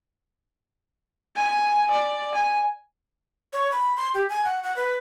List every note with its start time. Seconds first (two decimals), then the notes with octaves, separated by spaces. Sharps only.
1.36 G#5
1.91 D5
2.34 G#5
3.53 C#5
3.72 B5
3.97 C6
4.14 G4
4.29 G#5
4.45 F#5
4.63 F#5
4.76 B4